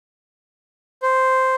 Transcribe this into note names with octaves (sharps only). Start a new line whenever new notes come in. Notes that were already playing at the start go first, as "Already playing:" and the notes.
C5